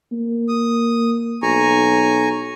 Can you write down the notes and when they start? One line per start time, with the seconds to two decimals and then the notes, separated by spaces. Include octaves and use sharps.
0.12 A#3
0.48 D#6
1.42 B1 G#5 A#5 C#6